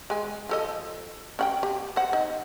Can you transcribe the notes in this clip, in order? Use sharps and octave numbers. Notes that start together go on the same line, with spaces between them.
G#3 G#5
F3 A4 D#5
C#4 F#5 G5
G4
C5 F#5
D#4